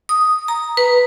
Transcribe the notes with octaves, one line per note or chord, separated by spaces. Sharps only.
D#6
A#5
B4